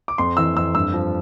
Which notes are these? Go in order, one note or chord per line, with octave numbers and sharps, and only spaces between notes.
D6
F2 C6
E3 E6
F2 E6
G2 E6
F3